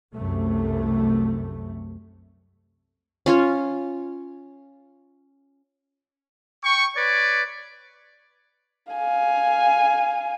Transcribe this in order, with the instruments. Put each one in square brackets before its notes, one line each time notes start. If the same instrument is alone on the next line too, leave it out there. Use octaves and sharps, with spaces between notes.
[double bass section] C2 F#2 C3 A3
[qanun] C#4 F4 C#5
[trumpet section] G5 C#6
B4 C#5 D5
[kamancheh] F5 G#5